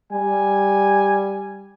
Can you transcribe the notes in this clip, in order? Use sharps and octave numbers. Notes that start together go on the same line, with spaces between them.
G3 G#5